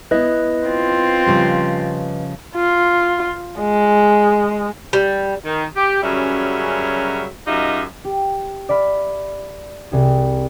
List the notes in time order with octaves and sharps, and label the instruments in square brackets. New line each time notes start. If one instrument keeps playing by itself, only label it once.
[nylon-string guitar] B3 E4 [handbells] B4 D#5
[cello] C4 F4
[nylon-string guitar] C#3 F3 G3
[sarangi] F4
G#3
[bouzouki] G3
[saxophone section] D#3
G4
F#2 C#3 F#3 G3 C#4 E5
F#2 D#4 F4 G4 D#5 E5
[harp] G4
D5 E5 B5 F6
C2 G#4